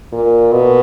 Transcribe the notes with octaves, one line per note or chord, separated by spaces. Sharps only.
A#2
B2